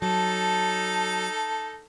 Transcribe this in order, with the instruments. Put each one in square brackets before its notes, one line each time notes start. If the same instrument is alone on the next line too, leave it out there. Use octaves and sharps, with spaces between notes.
[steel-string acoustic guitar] F#3 [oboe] D#4 [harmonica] A4 [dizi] A5